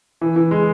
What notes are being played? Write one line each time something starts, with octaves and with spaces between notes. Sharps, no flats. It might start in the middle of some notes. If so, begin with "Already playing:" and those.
E3
E3
G#3